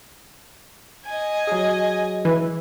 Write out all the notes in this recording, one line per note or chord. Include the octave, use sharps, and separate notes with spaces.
D#5 G#5
F#3 G#4
E3